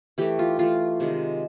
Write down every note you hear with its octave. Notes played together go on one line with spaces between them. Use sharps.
E3 A3 G4
F4
E3 A3 F4
C3 D#3 G#3